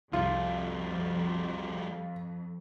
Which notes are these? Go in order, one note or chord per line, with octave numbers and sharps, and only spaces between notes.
C2 F2 F3 G3 F4